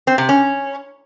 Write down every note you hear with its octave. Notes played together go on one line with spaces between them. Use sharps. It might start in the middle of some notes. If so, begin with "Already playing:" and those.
C4
C3
C#4